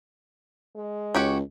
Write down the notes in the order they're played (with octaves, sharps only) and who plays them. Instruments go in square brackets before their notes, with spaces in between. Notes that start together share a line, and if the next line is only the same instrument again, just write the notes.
[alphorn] G#3
[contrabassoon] C#2 [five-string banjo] F#4 G4 C#5